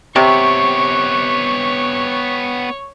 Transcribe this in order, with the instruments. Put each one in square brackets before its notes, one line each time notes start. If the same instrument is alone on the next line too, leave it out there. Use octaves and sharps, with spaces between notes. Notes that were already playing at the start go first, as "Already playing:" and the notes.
[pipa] C3 [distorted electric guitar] B3 G4 [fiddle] C#5 [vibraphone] C#6